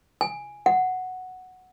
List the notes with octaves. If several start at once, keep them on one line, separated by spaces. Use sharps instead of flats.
G#5
F#5